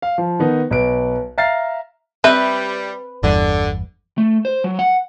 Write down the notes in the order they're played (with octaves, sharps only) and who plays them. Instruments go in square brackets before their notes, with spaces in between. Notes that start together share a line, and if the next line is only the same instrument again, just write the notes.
[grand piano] F5
F3
D#3 B3 D#4
B1 B4 D7
E5 F5 A#5 F6 A6 C7
[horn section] G3 [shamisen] C4 G4 E5 [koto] B4
[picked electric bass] G1 E2 G2 [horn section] D3
[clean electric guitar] A3
C5
F#3
F#5